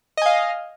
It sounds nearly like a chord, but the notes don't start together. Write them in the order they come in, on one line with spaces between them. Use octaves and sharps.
D#5 G#5 F5